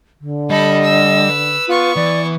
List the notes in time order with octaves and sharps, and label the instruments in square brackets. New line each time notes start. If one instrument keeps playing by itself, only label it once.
[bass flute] D3
[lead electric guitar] G3 [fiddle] A4 B5 [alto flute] D#5
[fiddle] E6
[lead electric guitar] B4
[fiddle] B3 C#6 [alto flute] F4
[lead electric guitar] E3 [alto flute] D5